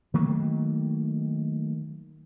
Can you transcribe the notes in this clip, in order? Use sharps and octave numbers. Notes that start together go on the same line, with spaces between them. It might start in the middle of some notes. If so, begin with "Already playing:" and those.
D#3 F#3 A3 A#3